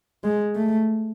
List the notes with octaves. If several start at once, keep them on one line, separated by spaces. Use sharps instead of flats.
G#3
A3